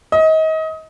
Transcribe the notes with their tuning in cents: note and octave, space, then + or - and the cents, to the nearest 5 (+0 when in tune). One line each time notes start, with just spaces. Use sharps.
D#5 +30